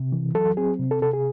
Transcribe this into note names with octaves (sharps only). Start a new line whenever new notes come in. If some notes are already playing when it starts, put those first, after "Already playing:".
Already playing: C3
E3
F#3 A4
C4 G#4
C3
A4
C3 A4
G#4